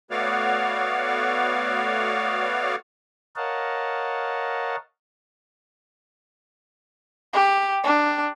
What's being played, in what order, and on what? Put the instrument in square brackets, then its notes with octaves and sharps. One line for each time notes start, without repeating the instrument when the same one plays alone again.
[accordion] A3 B3 F#4 C#5 D5 F5
[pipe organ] A#4 C#5 D#5 F5 F#5 A5
[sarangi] G4
D4